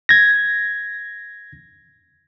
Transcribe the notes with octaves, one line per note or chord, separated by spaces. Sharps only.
G#6 A#6